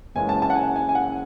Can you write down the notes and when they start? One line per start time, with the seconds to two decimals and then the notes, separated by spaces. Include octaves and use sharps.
0.15 F#1 F#2 E3 G#3 C#4 G#5
0.29 A5
0.42 A5
0.50 F#5
0.55 G#5
0.76 G#5
0.89 G#5
0.95 F#5